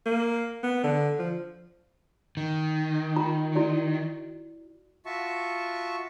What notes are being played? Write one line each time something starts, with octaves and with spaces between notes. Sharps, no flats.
A#3
B3
D3
F3
D#3
F4 G5 A#5
E4 F#4 D5
F4 F#4 E5 A5 C#6